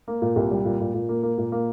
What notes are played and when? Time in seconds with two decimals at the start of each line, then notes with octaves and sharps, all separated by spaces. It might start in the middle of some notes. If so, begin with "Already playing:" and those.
0.08 A#3
0.22 A#2
0.36 C2
0.51 G3
0.65 A#2
0.80 A#2
0.94 A#2
1.09 A#3
1.23 A#3
1.38 A#2
1.52 A#3